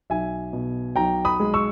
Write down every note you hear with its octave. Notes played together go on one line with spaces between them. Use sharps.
B1 E5 G#5
B2
B1 G5 A#5
B5 D#6
G#3
C#6 E6